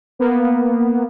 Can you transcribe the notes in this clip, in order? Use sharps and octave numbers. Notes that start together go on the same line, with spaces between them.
A#3 B3